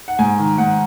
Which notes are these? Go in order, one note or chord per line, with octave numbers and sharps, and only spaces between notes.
F#5
G#2 G#5
D#3
G#2 F#5